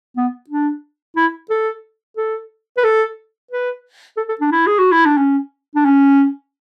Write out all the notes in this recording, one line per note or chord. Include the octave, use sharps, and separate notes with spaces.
B3
D4
E4
A4
A4
B4
A4
B4
A4
A4
D4
E4
G#4
F#4
E4
D4
C#4
D4
C#4